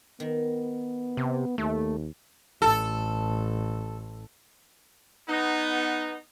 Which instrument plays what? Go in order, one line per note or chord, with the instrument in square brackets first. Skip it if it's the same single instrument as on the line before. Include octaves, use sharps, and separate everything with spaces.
[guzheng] D#3 [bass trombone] B3
[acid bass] C3
[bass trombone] D#2 [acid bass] A3
[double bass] A1 [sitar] A4
[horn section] B3 D#4